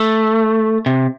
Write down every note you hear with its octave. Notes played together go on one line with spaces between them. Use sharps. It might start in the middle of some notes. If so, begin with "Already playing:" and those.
Already playing: A3
C3